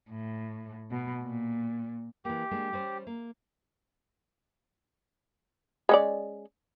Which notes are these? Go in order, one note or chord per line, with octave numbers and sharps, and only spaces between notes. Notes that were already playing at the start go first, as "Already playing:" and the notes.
A2
B2
A#2
E3 A#3 G4
G#3 A#3 D4
G3 C#4 C5
A#3
G#3 C#4 D5